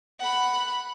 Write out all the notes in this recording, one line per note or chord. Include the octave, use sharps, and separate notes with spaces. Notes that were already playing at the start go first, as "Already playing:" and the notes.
F#5 B5